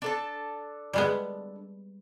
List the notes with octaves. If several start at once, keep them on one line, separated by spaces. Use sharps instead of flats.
D4 A4 A5
G3 G#3 B3